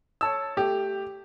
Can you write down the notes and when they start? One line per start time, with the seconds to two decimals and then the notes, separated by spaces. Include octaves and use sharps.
0.21 C#5 A5 E6
0.57 A3 G4